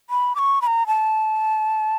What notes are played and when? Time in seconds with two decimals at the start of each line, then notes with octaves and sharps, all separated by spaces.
0.10 B5
0.35 D6
0.39 C#6
0.62 B5
0.67 A#5
0.87 A5